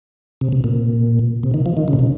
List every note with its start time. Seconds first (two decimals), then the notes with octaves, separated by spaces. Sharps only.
0.41 C3
0.52 C3
0.64 A#2
1.43 C3
1.54 D#3
1.66 F3
1.77 D#3
1.88 C#3
1.93 A#2
1.99 C3